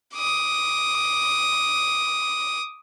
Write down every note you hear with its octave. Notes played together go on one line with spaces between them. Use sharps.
D6 D#6